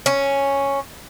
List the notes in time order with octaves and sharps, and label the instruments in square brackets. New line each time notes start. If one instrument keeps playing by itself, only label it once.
[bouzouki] C#4